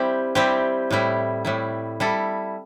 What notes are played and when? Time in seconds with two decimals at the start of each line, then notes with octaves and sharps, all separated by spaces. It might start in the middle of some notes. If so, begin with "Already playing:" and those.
Already playing: G3 C4 E4 G4
0.35 G3 C4 E4 G4
0.91 A2 G3 E4
1.45 A2 G3 E4
2.00 G3 E4 A4